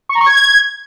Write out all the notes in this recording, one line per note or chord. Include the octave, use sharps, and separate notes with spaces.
C#6
A#5
C#6
G#6